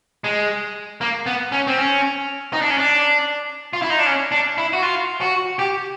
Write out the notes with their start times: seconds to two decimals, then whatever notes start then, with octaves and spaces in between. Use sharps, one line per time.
0.24 G#3
1.01 A#3
1.26 B3
1.52 C#4
1.67 C4
1.78 C#4
2.53 D#4
2.61 D4
2.70 C#4
2.78 D4
3.73 F4
3.82 E4
3.90 D#4
3.99 D4
4.06 C#4
4.32 D4
4.58 E4
4.73 F#4
4.82 F4
5.21 F#4
5.59 G4